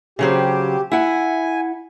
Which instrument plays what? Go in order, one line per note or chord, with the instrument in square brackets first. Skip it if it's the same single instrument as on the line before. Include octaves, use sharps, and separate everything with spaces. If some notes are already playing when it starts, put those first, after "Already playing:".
[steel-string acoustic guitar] C#3 F#3 C4 [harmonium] G4
[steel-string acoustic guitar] E4 F#5 [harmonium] G#5